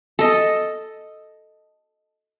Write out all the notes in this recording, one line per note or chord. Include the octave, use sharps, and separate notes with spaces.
A4 D#5